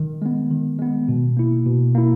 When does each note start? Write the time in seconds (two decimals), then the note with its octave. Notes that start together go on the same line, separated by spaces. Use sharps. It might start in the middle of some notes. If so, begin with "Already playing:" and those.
Already playing: D#3
0.22 G#3 B3
0.51 D#3
0.79 G#3 B3
1.08 B2
1.37 A#3 E4
1.66 B2
1.95 A#3 E4